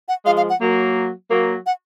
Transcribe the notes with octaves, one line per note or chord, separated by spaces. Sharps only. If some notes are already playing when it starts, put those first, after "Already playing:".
F#5
F3 G#3 F5
F5
F#5
F#3 A#3
F#3 A#3
F#5